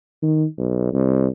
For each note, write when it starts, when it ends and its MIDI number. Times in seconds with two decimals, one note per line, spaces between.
0.22 0.45 51
0.58 0.91 35
0.93 1.27 36